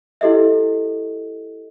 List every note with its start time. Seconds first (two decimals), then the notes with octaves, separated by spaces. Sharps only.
0.21 E4 G4 A4 D#5 E5